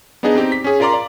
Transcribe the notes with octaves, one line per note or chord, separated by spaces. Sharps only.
B3 D4 D#4 G#4 D5 D#5
C4 D#4 G4
B6
C#4 G#4
F4 A#4 D5 A#5 C6 D6
D5